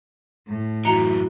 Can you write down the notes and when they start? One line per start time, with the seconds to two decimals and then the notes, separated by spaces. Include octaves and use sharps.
0.47 A2
0.85 F#2 E3 F#4 A#5 C#7 F7